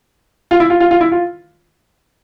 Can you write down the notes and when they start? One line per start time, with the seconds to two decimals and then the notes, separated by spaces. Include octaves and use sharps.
0.51 F4
0.60 E4
0.70 F4
0.80 F4
0.91 F4
1.01 E4
1.12 F4